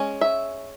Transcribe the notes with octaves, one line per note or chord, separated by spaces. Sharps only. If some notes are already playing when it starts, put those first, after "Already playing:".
Already playing: G#3 C#4
E5